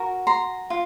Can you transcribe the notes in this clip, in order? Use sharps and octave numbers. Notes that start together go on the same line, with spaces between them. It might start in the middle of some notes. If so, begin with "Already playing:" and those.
Already playing: F#4 A#4
A#5 C6
F4